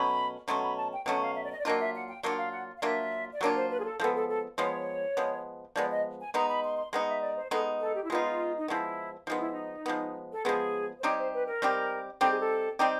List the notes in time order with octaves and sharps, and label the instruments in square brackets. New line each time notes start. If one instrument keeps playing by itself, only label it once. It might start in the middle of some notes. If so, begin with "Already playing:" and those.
Already playing: [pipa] B2 F#3 A3 C#4 [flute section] B5
[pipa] B2 F#3 A3 C#4 [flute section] C6
[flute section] B5
A5
G5
[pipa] B2 F#3 A3 C#4 [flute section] F#5
[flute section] F5
E5
D5
D#5
D5
[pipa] F#3 A#3 D4 F4 [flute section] D#5
[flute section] E5
F#5
G5
[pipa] F#3 A#3 D4 F4 [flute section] F#5
[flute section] F5
F#5
F5
[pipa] F#3 A#3 D4 F4 [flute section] E5
[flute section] D5
[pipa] F#3 A#3 D4 F4 [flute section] C#5
[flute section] C5
B4
G#4
A4
[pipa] F3 G#3 B3 [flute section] A4
[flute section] A4
A4
[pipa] F3 G#3 B3 [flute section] C#5
[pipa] F3 G#3 B3
[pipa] F3 G#3 B3 [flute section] D5
[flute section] D#5
G#5
[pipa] G#3 B3 D#4 [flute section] A#5
[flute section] B5
C6
C6
[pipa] G#3 B3 D#4 [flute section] F#5
[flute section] E5
D5
C5
[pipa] G#3 B3 D#4 [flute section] A4
[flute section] A4
G4
E4
[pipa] G#3 B3 D#4 [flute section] F4
[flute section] D#4
[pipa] F3 G#3 B3 [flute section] E4
[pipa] F3 G#3 B3 [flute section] D#4
[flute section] E4
D#4
[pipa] F3 G#3 B3
[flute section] A4
[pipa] F3 G#3 B3 [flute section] G#4
[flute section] C5
[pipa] G3 C4 D#4 G4 [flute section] C#5
[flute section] C5
B4
A#4
[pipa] G3 C4 D#4 G4
[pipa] G3 C4 D#4 G4 [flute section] A4
[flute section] G#4
A4
[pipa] G3 C4 D#4 G4